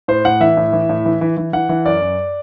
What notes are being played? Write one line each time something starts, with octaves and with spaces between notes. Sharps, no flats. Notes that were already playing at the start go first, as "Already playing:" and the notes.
A2 C5
A2 F#5
E3 E5
A2
E3
A2
E3
E3
E3
E3 F#5
E3
F#2 D5
F#2